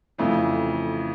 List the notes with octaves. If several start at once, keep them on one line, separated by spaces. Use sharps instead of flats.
F2 C#3 E3 A3